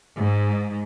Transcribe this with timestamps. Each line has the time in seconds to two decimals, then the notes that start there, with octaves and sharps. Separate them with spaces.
0.17 G#2